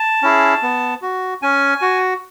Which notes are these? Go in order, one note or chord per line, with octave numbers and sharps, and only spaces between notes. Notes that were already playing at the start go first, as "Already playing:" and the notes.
Already playing: A5
C#4 E4 G#4
B3
F#4
C#4 G#5
F#4